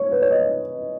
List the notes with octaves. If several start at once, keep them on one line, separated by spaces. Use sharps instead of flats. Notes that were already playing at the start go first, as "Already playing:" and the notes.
Already playing: C#5
B4
C#5
D#5